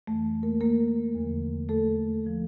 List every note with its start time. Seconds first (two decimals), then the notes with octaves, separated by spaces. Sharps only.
0.07 F2 E3 A3
0.43 A#3 A#4
0.61 A#3 A#4
1.15 E2 D3 F3
1.69 A3 A4
2.27 F3